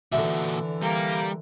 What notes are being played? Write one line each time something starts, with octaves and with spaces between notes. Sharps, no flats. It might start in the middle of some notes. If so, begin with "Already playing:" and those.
A#2 D3 E3 F#4 E5
G3 A#3 A#4